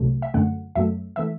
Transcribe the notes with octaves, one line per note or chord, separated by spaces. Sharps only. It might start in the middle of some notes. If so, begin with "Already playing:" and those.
Already playing: C2 C3 F#3 A3
E5
F#2 D3 A3 F#5
F#2 F#3 A3 E5
E3 A3 E5